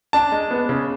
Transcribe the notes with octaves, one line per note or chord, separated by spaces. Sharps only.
D4 A5
G#3
B3
C#3